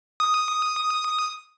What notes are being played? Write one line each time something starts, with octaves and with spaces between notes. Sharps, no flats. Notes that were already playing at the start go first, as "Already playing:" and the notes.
D#6